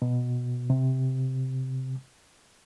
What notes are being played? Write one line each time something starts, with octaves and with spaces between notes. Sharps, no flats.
B2
C3